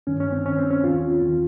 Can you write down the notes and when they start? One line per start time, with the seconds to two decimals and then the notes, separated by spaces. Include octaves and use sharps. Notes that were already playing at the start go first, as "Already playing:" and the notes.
0.07 G2 D#3 C#4
0.20 C#4
0.32 C4
0.45 G2 D#3 C#4
0.58 C4
0.70 C#4
0.84 D#2 D#3 F4
1.22 D#2 D#3